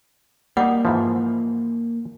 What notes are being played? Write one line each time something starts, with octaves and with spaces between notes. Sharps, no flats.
G3 A#3 D#4 F#5 D6
G#2 E3 F3